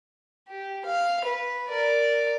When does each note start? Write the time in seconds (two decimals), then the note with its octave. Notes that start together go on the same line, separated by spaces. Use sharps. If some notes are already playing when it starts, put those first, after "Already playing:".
0.48 G4
0.85 F5
1.25 B4
1.68 A#4 D5